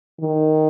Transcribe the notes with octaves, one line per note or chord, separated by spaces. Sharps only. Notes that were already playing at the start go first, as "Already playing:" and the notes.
D#3